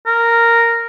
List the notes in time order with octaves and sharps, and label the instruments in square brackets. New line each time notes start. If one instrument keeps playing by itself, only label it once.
[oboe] A#4